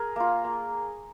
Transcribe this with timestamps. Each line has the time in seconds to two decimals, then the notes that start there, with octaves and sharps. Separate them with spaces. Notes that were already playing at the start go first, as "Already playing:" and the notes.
Already playing: G#4 A#4
0.16 A#3 F4
0.44 A#3